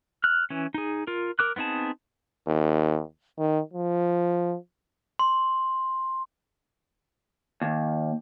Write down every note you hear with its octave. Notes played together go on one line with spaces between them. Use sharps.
F6 F#6
E3 C#4
D#4 G#4
F4 A#4
A#4 D6 F#6
B3 C4 D#4 G#4 A5
D#2
D#3
F3
C6
D#2